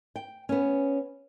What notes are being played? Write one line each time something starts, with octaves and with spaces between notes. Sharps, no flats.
G5
B3 C#4